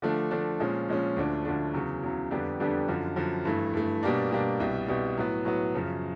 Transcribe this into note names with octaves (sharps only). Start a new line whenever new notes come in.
D3 F3 A3 D4
D3 F3 A3 D4
A#2 F3 G#3 C#4
A#2 F3 G#3 C#4
D2 D3 F3 A3 D4
D2 D3 F3 A3 D4
E2 C#3 F#3
E2 C#3 F#3
F2 D3 G3 B3 D4
F2 D3 G3 B3 D4
F#2 D3 F3
F#2 D3 F3
G2 E3 A3
G2 E3 A3
B2 G3 A#3 D4
B2 G3 A#3 D4
C2 B2 G3
C2 B2 G3
A2 F#3 B3
A2 F#3 B3
F#2 C#3 F3